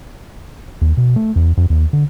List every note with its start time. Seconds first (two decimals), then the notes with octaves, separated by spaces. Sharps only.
0.81 D#2
0.97 B2
1.16 A3
1.36 E2
1.57 F2
1.70 D#2
1.93 D3